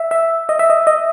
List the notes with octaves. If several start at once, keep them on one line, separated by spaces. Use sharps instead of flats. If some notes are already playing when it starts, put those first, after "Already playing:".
Already playing: E5
E5
D#5
E5
D#5
D#5